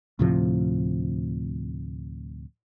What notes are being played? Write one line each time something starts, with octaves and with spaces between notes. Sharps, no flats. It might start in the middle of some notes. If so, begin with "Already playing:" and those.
D2 A2 C3 F3